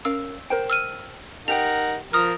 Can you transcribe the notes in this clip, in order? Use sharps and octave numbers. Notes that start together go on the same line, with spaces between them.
C#4 A#4 F5 E6
A#4 C5 G5
E6 F6 D#7
D#4 G4 A#4 F#5 G5 F7
F3 A#4 D#6 F6